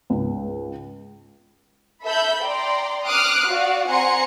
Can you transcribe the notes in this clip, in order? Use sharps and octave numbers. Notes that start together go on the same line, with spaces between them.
C#2 G#2
A4 E5 B5 G6
D5 G5 A#5 C6
D6 D#6 F6 F#6 C7 D7
F#4 D5 F5
C4 F#5 G#5 A#5 C6 C#7